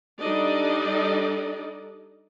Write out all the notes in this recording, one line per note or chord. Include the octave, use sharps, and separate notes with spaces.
G3 D4 D#4 A4 D5 D#5